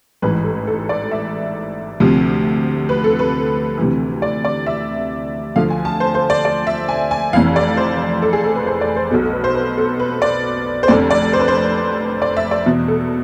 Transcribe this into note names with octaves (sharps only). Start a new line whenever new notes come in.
A1 G#2 E3 B4
A4
A4
D5
E5
D2 C3 F3
B4
A4
B4
D2 C3 E3
D5
D5
E5
D2 D3 F3 F5
G#5
A5
C5
C5
D5
D5
E5
G#5
G#5
F1 F2 E3 F5
D5
C5
A4
G#4
A4
B4
C5
D5
C5
B1 B2 A4
A4
B4
C5
B4
A4
B4
D5
C5
F1 F2 D3 D5
D5
C5
B4
C5
D5
E5
D5
E2 B2
A4